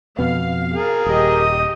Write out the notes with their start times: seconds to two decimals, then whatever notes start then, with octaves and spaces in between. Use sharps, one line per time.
0.19 F2 B2 B3 F5
0.74 G#4 A#4
1.06 D#1 G4 D#5 D#6